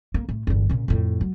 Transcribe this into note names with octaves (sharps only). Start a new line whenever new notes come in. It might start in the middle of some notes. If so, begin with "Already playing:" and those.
A#3
A2
G1 E2
A#2 C#3
F2 A2
F#3